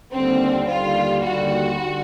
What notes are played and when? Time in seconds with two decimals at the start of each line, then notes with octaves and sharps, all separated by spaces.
0.12 D#2 D3 G3 C4
0.68 D#2 D3 G3 F4
1.23 D#2 D3 G3 F#4
1.80 D3 G3